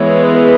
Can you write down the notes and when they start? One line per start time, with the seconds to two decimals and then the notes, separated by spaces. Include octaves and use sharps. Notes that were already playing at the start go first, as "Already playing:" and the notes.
Already playing: E3 G#3 B3 C#5
0.24 G#4
0.35 B4